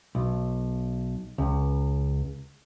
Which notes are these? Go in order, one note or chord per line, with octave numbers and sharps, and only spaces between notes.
B1
C#2